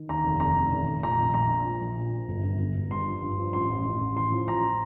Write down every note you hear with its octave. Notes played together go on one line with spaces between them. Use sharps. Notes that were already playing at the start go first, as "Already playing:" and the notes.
Already playing: D#3
D#2 A#5
F1
F1 A#5
D#3
F1
F1
A#2 A#5
A#1
A#1 A#5
A#2
F3
A#1
A#2
F3
G1
G1
G1
G1
G2 C6
F3
G2
F3
A1 C6
A1
A1
A1
A2 C6
F3
A1 A#5